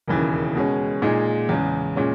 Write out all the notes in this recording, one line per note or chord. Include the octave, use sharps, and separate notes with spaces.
E1 D#2 C#3 E3
B2 G#3 C#4
A#2 G#3 D#4 G#4
E2 C#3 G#3
A#2 G#3 C#4